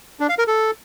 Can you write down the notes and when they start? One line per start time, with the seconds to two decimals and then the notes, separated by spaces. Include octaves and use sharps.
0.20 D4
0.29 F5
0.38 A#4
0.47 A4